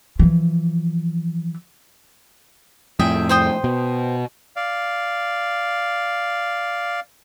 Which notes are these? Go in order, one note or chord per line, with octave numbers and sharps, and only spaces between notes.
E3 F3
F2 A2 G#4 E5 G5
C5 G5 D#6
B2
D5 F5